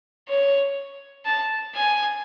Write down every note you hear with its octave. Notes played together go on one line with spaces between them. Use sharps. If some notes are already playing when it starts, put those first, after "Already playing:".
C#5
A5
G#5